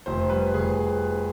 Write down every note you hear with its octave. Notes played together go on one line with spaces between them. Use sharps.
F1 C5
G3 B4
F1 G#4